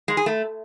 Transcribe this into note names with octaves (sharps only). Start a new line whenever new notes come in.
G#3
G#4
A3